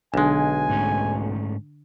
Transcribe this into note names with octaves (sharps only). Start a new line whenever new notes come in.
B1 D3 G#3 D4 G#5
G#2 A3 C#4